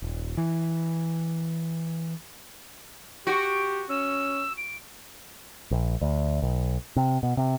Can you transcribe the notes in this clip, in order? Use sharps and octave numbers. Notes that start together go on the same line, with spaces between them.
D#1
E3
F#4 G4 D7
C#4 E6
D7
A#1
D2
B1
C3
B2
C3